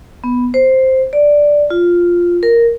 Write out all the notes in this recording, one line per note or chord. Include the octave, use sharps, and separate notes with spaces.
B3
C5
D5
F4
A#4